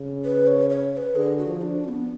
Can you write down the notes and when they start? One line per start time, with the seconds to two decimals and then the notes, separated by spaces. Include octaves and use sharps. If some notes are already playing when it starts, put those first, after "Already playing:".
Already playing: C#3
0.25 B4
0.47 C#5
0.70 C#5
0.93 C#5
0.97 B4
1.15 D3 G#4
1.38 F#4
1.46 F3
1.62 D4
1.84 C#4
1.88 B3